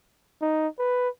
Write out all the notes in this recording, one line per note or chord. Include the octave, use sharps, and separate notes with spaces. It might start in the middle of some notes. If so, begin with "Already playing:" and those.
D#4
B4